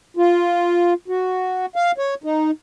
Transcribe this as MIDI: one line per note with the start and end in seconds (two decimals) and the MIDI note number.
0.17 0.94 65
1.08 1.66 66
1.76 1.92 77
1.98 2.14 73
2.24 2.51 63